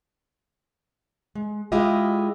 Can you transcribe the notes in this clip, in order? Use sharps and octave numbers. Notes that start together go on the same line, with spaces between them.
G#3
G#3 E4 F4 G4 D#5